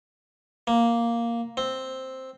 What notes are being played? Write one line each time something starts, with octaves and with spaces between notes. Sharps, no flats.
A#3
C4